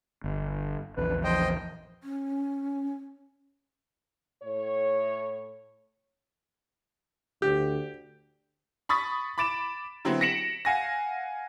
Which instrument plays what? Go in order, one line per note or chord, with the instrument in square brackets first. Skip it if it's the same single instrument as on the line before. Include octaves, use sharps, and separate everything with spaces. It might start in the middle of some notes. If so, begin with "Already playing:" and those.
[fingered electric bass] G1
[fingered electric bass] A#1 E2 [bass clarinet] B4
[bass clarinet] F3 [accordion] C5 D#5 G5
[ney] C#4
[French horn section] A2 C#5
[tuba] D2 [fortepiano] G4
[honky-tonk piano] B5 C#6 D#6 A6 B6
B5 D6 A6 D7 E7
D3 F#3 B3 C4 E4
A#6 B6 C#7 D7 E7 F#7
F5 F#5 G#5 A#6